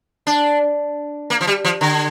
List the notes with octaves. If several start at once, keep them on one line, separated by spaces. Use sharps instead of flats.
D4
A#3
F3
G3
F3
D3